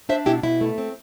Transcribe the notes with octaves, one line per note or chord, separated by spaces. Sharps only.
D4 C5 E5
B2 E4 G4
B2 E4
A3
C4